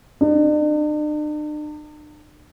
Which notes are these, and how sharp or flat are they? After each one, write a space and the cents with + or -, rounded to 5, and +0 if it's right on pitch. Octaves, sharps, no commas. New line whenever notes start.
D4 +45